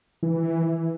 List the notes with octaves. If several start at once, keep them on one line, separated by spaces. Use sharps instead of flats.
E3